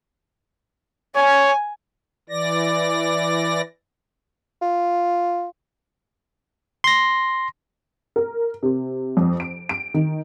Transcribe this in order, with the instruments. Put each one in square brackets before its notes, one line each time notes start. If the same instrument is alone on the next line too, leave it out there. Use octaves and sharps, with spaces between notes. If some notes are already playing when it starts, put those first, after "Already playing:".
[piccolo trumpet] C#5 [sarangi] G#5
[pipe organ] E3 D5 A#6
[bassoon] F4
[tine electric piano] C6 A#6
[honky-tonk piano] A#4
C3
F2
D7
D7
D#3